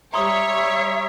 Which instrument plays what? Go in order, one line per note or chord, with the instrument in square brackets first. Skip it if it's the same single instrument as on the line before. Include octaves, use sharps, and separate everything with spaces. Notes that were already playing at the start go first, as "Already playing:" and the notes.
[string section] G3 C#5 [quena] E5 [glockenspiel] A#5 C6 D#6